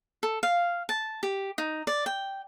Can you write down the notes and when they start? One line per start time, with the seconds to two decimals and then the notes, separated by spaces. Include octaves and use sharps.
0.23 A4
0.43 F5
0.89 A5
1.23 G4
1.58 D#4
1.87 D5
2.06 G5